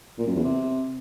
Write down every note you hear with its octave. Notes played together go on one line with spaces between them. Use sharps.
A#2
F#2
E2
C3